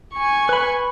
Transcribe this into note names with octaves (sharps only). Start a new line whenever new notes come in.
G#5 C#6
B4 B5